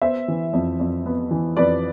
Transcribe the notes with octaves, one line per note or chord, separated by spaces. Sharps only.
B3 C5 E5
E3
F2
F2
B3
E3
F2 B4 D5